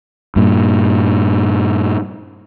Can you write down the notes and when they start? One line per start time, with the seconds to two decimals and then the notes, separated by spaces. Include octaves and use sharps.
0.36 G2 A#2